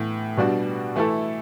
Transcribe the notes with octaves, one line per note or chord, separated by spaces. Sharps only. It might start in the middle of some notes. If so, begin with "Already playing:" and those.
Already playing: A2 E3 B3
B2 G3 D4 F#4
E3 A3 E4 A4